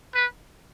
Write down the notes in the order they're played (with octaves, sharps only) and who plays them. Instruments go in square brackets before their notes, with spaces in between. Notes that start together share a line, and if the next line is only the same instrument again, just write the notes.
[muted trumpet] B4